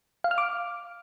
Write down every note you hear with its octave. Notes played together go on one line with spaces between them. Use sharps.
F5
F6
D6